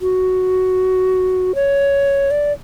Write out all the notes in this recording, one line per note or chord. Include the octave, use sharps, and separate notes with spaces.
F#4
C#5
D5